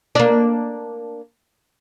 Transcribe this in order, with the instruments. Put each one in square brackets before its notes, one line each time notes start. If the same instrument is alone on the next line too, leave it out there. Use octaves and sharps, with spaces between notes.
[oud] A#3 D4